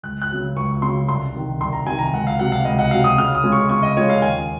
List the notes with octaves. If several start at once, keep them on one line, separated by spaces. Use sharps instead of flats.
C#2 F#6
F#6
C#3 F#3
C#2 C#6
C#3 F#3 C6
C2 C6
C3 D#3
C2 C6
A#5
C3 D#3 G#5
A#5
C#2 F#5
F5
C3 F#3 F#5
F5
C#2 D#5
F#5
C3 F#3 F5
D#6
C#3 F6
D#6
G#3 C#4 F4
C#6
C#3 C#6
D#5
G#3 C#4 F4 C#5
F5
D#2 G#5